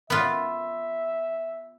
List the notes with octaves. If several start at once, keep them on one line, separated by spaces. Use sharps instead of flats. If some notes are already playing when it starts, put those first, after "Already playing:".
B3 F4 E5